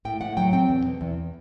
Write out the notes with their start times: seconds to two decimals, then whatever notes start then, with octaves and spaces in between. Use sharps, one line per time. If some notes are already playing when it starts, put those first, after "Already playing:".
0.05 A2 G5
0.21 A2 F#5
0.37 F#3 G5
0.53 C4 G5
0.69 E2
0.85 B2
1.01 E2